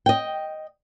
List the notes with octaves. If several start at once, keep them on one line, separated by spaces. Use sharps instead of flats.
D#5 G5